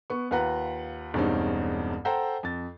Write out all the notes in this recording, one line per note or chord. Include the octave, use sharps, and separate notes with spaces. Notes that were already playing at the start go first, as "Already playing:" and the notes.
B3 C#6
D#2 F4 B4 F#5 A#5
E1 E2 G2 C4 C#4 D#4
A4 C5 F#5 G5 A#5
F2 A6